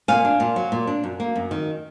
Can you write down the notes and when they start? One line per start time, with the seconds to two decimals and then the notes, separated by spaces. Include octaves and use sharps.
0.08 A#2 F5 G#5
0.25 D4
0.40 A#2
0.56 F#3
0.72 A#2
0.87 D4
1.04 F#2
1.20 A#3
1.36 F#2
1.51 D#3